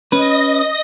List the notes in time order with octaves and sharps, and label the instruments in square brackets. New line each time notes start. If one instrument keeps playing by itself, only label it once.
[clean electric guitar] C#4 B4 [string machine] D#5 D#6 A#6